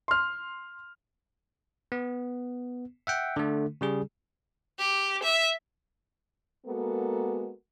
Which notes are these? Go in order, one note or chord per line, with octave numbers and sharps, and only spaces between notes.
C6 F6
B3
E5 F#5 G5
D3 A3
C#3 G3 G#4
G4
E5
G#3 A#3 B3 F#4 A4 A#4